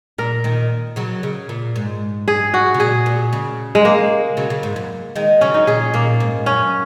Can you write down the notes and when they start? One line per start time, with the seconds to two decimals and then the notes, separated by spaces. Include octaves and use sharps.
0.18 A#2 A#4
0.44 A#2 D#3
0.96 C#3 F#3
1.23 C#3
1.49 A#2
1.76 G#2
2.28 G#4
2.54 F#4
2.74 C#3
2.80 A#2 G#4
3.06 A#2
3.33 C#3
3.75 G#3
3.85 A#3
4.37 C#3 F#3
4.50 C#3
4.63 G#2
4.76 F#2
5.16 D#3 G#3
5.41 C#3 F#3 C#4
5.54 D#4
5.67 A#2 D#3 G#4
5.94 A#2 A#3
6.20 G#2
6.46 F#2 C#4